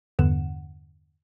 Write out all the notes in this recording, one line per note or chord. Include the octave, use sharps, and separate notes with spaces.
E2 G2 D3 B3 F#5 E7